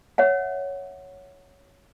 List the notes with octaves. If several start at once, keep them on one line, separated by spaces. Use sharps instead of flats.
C#5 E5 F#5